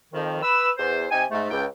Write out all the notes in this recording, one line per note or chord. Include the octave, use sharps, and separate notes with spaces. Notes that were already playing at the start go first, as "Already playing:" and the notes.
F2 D#3 F3
B4 E6
E2 C5
C3 D#4 G5 G#5
G#2 A3
C#2 G5